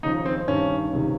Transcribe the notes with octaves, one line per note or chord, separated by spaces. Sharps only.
D#2 C#3 F3 D#4
C4
G2 D#3 C#4
C#2 C3 D#3